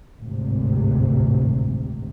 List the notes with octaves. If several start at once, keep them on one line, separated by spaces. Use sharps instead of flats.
G#1 D2 A2 C3